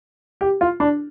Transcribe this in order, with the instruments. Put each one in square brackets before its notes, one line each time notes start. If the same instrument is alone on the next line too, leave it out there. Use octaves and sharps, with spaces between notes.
[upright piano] G4
F4
D4